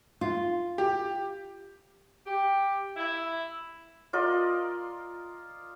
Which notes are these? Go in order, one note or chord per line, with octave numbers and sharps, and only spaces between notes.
F4
G4
G4
E4
F4 A#4 D5 D#5